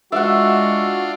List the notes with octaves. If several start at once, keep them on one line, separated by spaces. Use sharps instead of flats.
G#3 D4 F4 F#4 E5 F#5